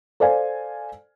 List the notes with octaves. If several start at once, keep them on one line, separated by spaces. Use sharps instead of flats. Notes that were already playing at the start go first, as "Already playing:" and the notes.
A4 C5 D5 F5 G#5